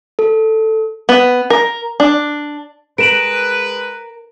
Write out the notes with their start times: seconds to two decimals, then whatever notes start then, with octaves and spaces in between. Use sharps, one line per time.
0.19 A4
1.09 B3
1.50 A#4
2.00 D4
2.98 G#3 A#4 B4 D7 E7 F#7